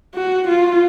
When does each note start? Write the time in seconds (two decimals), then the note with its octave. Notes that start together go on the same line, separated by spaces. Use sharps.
0.15 F#4
0.48 F4